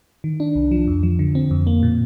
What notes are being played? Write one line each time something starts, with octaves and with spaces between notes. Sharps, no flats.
D#3
D4
C2
F3
F2
F3
D3
C4
F2
A#3
A#2